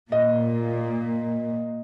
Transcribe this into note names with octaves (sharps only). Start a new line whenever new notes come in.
A#2 D#5